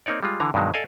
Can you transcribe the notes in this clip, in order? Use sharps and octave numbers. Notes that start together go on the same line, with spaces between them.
A#3 C4 D#4 C#5 D5
G3 G#3 F4
D3 E3 A#5
G2 B2 D#3 F#3 G#3
A4 D5 D#5 F5 G#5